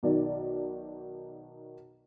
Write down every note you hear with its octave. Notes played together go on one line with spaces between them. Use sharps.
B1 D#3 D5